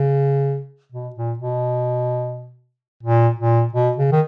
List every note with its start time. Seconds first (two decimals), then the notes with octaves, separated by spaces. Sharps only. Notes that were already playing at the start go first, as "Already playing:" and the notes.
Already playing: C#3
0.92 B2
1.16 A#2
1.39 B2
3.03 A#2
3.39 A#2
3.73 B2
3.97 C#3
4.12 D#3